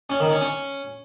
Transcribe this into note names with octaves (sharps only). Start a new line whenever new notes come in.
C#4
D#3
C#4
C#4